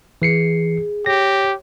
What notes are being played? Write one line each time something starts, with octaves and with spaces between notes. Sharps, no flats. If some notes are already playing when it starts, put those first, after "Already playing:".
E3 G#4 C7 C#7
G4 C#5 A#6